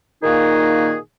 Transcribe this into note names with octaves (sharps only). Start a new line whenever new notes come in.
A#2 D#3 A#3 D#4 F#4 G#4